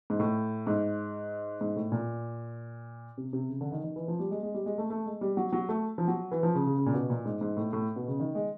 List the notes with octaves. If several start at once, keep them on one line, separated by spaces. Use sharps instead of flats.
G#2
A2
G#2
G#2
A2
A#2
C3
C3
C#3
D3
D#3
D#3
E3
F3
G3
G#3
G#3
G3
G#3
A3
A3
G#3
G3
F#3
F#3
A3
F3
F#3
E3
F3
C#3
C#3
C#3
A#2
B2
A#2
G#2
G#2
A2
A2
B2
C#3
D#3
G#3